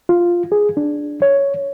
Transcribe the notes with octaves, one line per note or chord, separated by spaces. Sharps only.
F4
G#4
D4
C#5